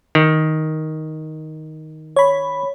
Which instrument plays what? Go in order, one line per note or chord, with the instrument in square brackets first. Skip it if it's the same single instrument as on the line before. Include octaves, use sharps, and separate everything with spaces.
[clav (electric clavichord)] D#3
[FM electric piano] C#5 B5